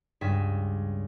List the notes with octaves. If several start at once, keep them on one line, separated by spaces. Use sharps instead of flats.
C#2 G2 G#4 B6 E7